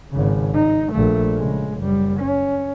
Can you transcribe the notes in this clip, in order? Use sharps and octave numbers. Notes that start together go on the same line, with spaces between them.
G#1 C#3
D#4
A#1 A3
C#3 G#3
F#1 G3
C#4